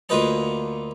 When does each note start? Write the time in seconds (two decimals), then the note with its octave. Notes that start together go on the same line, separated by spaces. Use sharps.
0.09 D2 A#3 F4 B4 D#5 A5